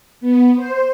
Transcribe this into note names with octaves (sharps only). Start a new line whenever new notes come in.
B3
C5